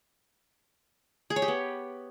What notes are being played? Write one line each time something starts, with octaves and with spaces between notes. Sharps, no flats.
G#4
C#5
G4
B3